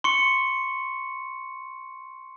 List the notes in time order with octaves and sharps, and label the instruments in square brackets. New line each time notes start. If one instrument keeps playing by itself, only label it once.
[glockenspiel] C6 C#6 C#7